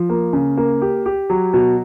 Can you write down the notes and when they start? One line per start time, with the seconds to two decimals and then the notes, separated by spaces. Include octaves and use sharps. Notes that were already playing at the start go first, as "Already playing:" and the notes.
Already playing: F3
0.09 A#3
0.33 C#3
0.57 A#3
0.82 G4
1.06 G4
1.30 F#3
1.54 B2